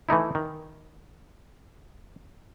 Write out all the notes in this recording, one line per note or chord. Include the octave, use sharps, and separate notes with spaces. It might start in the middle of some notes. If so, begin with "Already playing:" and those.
E3 A3 D#4 E4
D#3